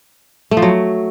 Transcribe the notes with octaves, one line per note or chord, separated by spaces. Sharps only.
A3
F3
F#3